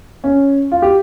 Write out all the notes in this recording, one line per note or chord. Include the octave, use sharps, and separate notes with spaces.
C#4
F4
G4